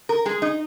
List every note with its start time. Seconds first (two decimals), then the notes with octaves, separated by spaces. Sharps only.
0.09 A#4
0.25 G#3 G#4
0.42 D#4